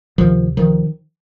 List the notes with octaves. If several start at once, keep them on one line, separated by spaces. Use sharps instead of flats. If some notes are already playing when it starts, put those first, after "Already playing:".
D2 C3 D#3 F3
D#3 F3